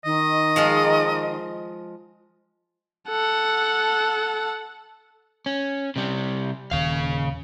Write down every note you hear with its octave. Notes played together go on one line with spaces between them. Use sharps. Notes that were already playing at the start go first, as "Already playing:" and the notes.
D#3 D#5
F3 G#3 F4
A4 F#5
C#4
C3 G3
D#1 D#2 C#3 F5